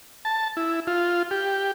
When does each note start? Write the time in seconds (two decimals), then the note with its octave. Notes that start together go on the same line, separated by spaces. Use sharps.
0.25 A5
0.57 E4
0.87 F4
1.31 G4